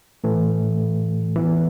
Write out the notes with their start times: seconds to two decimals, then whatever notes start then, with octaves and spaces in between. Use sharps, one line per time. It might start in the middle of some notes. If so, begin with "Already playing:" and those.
0.24 A2 E3 A3
1.36 E3 B3 E4